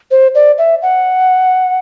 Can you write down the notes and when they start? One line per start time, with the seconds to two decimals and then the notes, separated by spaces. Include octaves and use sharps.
0.11 C5
0.35 D5
0.58 E5
0.82 F#5